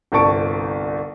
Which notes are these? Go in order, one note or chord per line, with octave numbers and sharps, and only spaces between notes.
G1 C2 C4 A5 C#6 D7